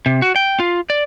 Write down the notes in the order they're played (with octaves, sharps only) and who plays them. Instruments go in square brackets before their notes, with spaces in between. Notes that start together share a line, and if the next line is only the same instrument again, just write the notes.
[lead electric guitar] C3
F#4
G5
F4
D5